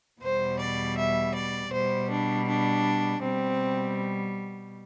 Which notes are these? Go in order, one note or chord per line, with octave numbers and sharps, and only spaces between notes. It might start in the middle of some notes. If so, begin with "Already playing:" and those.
E2 B2 G3 C5
D5
E5
D5
B2 G3 C5
D4
D4
B2 G3 C4